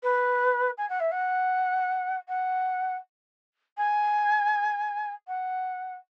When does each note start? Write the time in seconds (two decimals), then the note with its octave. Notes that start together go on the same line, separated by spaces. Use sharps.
0.03 B4
0.77 G#5
0.89 F#5
0.99 E5
1.11 F#5
2.28 F#5
3.77 G#5
5.27 F#5